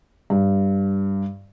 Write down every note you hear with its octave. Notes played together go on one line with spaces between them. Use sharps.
G2